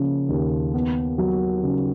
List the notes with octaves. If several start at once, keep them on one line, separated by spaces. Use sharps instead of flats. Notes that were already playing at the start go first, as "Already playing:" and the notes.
Already playing: C#3 F3 A#3
D#2
B3
F#3
C#3